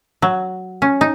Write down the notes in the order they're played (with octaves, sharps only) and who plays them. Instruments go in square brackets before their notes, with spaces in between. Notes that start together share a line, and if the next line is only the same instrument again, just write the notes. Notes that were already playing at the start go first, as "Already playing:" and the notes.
[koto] F#3
C#4
D#4